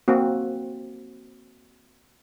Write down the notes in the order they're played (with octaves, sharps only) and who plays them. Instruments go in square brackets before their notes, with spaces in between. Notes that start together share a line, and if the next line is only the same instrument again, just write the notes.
[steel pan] A#3 C4 F#4